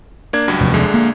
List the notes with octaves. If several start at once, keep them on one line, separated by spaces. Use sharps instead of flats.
A#3 D4 G#6
C#2 G2 F#3
F1 D#2
A#1 D3 G#3
A#3